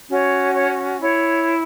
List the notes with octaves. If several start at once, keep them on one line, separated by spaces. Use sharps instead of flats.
C#4 F#4 C#5
C#5
E4 C#5